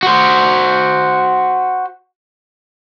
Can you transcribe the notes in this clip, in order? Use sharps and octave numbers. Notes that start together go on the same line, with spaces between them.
F#4 C5